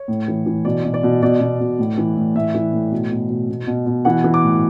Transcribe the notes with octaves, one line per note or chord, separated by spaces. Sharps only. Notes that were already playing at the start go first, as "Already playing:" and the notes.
Already playing: C#5
A2
E3
E3
B2 D5
B2
D5
B2
B2 D5
B2
B2
A2
E3
A2
A2 E5
E3
A2
B2
B2
B2
B2
B2
B2
E3 F#5
E3
D6
A2